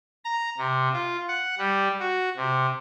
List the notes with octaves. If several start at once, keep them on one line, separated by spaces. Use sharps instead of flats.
A#5
C3
F4
F#5
G3
F#4
C3